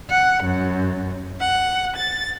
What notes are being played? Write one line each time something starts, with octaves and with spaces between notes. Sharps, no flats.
F#5
F#2
F#5
A6